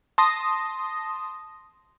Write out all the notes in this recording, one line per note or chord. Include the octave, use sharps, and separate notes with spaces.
A5 C6 D#6 A#6